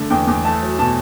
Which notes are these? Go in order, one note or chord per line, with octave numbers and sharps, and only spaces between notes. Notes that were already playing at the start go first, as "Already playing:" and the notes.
Already playing: D3 A3
E2 G5
E2
A3 A5
F#3
B2 A5